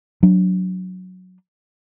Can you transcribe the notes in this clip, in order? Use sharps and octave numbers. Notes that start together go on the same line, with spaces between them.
F#3 D4